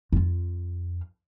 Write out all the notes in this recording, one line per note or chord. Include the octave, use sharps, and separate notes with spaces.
F2 F4